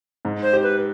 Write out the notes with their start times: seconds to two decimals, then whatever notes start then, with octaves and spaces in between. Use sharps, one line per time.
0.25 G#2
0.43 C5
0.53 G4
0.63 B4